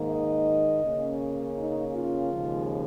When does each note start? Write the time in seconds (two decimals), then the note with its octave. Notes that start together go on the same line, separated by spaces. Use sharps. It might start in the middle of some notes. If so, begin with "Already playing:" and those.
Already playing: G#2 D#3 A#3 D#4
0.09 D#5
0.83 C#3 A#3 C#4
1.57 D#4
1.94 F4
2.31 D#2 C#3 F3 G#3